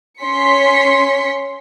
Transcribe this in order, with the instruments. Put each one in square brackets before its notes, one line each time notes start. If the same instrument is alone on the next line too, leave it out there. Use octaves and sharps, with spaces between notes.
[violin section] C#4 C6 B6 C#7